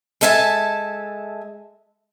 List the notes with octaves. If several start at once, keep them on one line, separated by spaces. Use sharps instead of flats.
G#3 A4 E5 G#5 A5